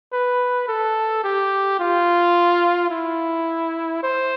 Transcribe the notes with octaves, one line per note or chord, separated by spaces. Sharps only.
B4
A4
G4
F4
E4
C5